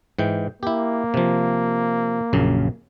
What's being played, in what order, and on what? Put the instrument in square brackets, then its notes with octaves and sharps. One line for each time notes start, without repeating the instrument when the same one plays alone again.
[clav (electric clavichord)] G#2 E3 G5
[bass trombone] A#3 [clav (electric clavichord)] E4 G4
[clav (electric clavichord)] C3 F3
A#1 F#2 C#3